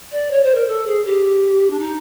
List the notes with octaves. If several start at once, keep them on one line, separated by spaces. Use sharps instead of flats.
D5
C#5
C5
A#4
A4
G#4
G4
D4
D#4